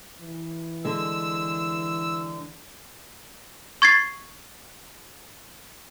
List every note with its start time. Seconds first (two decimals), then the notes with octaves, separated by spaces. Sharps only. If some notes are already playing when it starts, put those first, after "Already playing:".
0.21 E3
0.85 D3 G#3 E6
3.82 C#6 G#6 A6 C7